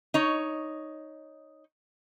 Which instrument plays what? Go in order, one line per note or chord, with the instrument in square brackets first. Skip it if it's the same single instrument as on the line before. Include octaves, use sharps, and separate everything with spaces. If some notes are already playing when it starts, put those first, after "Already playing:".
[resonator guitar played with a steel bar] D#4 C#5